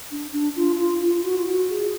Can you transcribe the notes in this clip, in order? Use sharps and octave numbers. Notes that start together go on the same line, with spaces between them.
D4
D4
F4
F4
F4
F#4
F4
F#4
G#4